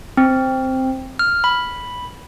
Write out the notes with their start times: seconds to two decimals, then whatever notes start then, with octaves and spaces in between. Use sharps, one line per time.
0.17 C4
1.19 F6
1.44 B5